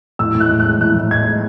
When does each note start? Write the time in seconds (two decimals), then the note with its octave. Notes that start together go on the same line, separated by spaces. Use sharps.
0.19 A2 E6
0.35 A2
0.40 F#6
0.50 G#3
0.60 F#6
0.65 G#3
0.81 A2 F#6
0.95 A2
1.11 G#3 G#6
1.27 G#3